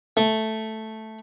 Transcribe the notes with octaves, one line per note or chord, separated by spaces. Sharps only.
A3